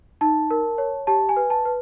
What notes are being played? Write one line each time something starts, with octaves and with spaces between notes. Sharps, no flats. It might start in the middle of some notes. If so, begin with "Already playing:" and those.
D#4 A5
A#4
C#5
G4 A5
G#5
B4
A5
B4